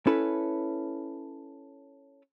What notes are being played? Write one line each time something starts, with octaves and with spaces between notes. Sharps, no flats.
C#4 E4 A4 B4